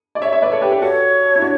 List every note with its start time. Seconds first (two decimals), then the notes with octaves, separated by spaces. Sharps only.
0.15 D5
0.22 C#5 E5
0.32 C#5 E5
0.42 B4 D5
0.52 A4 C#5
0.61 G4 B4
0.72 G4 B4
0.82 F#4 A4 C#5
1.35 E4
1.42 D4 F#4